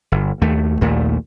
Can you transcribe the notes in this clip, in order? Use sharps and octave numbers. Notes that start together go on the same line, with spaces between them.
G1
D#2 A3
A#1 D#2 A#2 A3